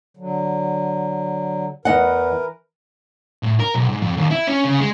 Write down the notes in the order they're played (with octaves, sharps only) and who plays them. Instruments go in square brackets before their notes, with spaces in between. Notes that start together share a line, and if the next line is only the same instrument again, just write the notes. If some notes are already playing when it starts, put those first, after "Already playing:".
[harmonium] D3 F#3
[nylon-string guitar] E2 D#5 F#5 [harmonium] E3 A#4 B4
[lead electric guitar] A2
A#4
B1
G#2
F2
D#2
E4
C#4
C#3
G#3